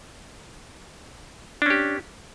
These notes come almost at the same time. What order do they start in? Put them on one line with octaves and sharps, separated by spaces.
D4 C#4 G4